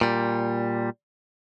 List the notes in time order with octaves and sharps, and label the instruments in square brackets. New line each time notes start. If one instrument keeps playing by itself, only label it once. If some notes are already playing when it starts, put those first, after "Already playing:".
[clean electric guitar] A#2 G3